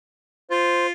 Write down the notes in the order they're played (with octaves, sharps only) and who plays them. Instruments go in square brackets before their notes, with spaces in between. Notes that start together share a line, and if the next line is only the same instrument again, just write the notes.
[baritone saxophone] F4 [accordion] C5